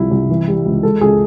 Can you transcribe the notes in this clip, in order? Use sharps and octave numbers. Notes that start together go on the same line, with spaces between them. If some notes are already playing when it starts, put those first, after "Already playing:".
Already playing: C2 F3 E4
C2
E3
G3
C#2
G#3 A4
C#2 G#4